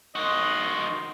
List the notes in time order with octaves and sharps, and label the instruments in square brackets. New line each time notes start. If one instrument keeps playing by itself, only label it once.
[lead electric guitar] D#3 F#4 [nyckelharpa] D#5 C6